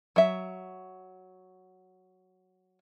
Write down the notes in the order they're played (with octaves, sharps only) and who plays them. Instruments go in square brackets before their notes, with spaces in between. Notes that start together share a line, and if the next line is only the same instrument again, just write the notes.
[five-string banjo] F#3 E5